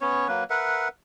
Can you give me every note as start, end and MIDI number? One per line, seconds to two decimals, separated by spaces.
0.01 0.28 59
0.01 0.28 61
0.01 0.28 73
0.28 0.44 54
0.28 0.44 58
0.28 0.44 71
0.50 0.88 70
0.50 0.88 71
0.50 0.88 76
0.50 0.88 78